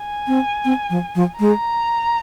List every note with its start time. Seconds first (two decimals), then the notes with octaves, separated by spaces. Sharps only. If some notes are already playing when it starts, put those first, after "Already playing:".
Already playing: G#5
0.28 C4
0.65 C4
0.90 F3
1.15 F3
1.40 G#3 A#5